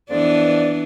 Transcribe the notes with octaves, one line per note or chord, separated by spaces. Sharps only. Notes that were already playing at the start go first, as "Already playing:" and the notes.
F2 E3 B3 D4 D5